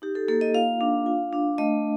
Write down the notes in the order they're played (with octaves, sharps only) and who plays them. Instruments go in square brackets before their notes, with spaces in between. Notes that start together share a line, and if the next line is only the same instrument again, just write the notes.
[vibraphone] D#4 G4
A4
A#3 A4
D#5
F4 F5
D4
F4
D4
A3 D#5